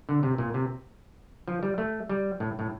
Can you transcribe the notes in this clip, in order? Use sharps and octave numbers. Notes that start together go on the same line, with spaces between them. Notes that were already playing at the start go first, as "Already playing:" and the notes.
D3
C3
A#2
C3
F3
G3
A3
G3
A2
A2